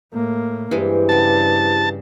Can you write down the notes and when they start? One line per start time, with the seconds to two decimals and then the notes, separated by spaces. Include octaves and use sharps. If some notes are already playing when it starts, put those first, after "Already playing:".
0.13 A2 A#3
0.71 G2 E3 G#3 E4 G4 C5
1.09 C#3 G3 A5